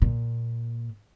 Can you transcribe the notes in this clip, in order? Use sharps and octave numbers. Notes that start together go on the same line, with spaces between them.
A#2